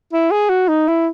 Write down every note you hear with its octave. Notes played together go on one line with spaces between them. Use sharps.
E4
G#4
F#4
D#4
E4